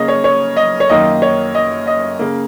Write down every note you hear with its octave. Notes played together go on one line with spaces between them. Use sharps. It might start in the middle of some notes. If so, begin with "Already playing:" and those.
Already playing: C#3 A#3 C#4 D#5
C#5
C#5
D#5
C#5
F#2 D#3 A#3 D#4 D#5
C#5
D#5
D#5
C#3 A#3